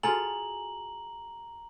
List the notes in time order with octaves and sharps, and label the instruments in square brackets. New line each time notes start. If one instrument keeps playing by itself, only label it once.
[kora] F4 G#4 A4 [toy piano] F#4 G#5 [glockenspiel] A#5 F#7